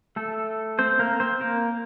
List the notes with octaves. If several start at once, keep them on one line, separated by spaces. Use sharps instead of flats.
A3 A4
C4 C5
A#3 A#4
C4 C5
A#3 A#4